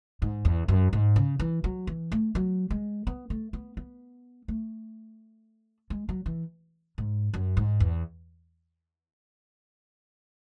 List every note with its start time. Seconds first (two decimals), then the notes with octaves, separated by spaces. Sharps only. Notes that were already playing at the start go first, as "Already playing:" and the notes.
0.22 G#2
0.45 E2
0.68 F#2
0.93 G#2
1.16 C#3
1.40 E3
1.64 F#3
1.87 E3
2.12 A3
2.35 F#3
2.70 G#3
3.07 B3
3.30 A3
3.53 B3
3.77 B3
4.48 A3
5.90 G#3
6.09 F#3
6.26 E3
6.98 G#2
7.34 F#2
7.57 G#2
7.80 E2